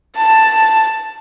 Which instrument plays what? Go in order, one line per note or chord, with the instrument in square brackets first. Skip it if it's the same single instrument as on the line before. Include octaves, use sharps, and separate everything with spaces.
[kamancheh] A5